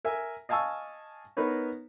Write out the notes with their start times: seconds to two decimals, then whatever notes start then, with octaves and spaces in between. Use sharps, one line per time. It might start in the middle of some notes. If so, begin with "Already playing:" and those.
0.05 A#4 E5 G#5
0.49 D#5 F5 G#5 A5 C#6 E6
1.37 B3 D#4 A#4 B4 C#5